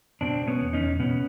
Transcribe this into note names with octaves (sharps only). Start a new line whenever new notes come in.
B2 C4 D4
B2
B3 C#4
E2
C#4 D#4
E2
B2 B3 C#4